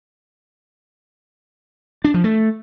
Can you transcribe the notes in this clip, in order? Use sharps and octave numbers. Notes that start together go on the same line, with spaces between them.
D4
F3
A3